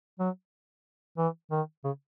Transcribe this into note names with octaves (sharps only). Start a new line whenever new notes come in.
F#3
E3
D#3
C#3